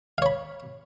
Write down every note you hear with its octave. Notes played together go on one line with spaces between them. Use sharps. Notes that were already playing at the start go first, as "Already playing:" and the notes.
C#5 F5 B5